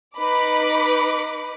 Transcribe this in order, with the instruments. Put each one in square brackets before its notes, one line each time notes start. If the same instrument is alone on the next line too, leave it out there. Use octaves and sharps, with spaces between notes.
[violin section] D#4 B4 B5 D6